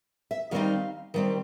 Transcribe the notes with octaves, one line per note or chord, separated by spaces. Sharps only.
E5
D#3 G3 C4 D#4 F5
D#3 G3 C4